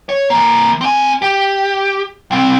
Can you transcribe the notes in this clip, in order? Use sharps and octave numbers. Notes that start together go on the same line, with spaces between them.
C#5
E3 A#3
C4 G#5
G4
C2 C4